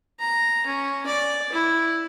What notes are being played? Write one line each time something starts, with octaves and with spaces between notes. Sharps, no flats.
A#5
C#4
D5
E4